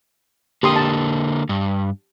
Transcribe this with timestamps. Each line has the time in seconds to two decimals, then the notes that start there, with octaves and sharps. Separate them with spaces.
0.63 D3 A#3 G4 C6 D#6
0.76 A5
1.49 G2